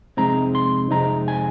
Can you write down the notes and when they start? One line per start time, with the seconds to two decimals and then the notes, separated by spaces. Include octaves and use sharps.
0.17 F2 C3 G#3 C4 D#4 A#5
0.55 C6
0.91 F2 C3 G#3 C4 D#4 A#5
1.28 G#5